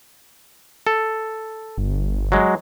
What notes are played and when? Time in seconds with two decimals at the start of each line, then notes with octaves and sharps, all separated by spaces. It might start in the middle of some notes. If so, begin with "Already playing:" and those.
0.87 A4
1.77 G1
2.32 F#3 G#3